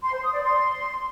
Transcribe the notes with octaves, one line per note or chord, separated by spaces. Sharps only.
C6
C5
D#6
D5
C6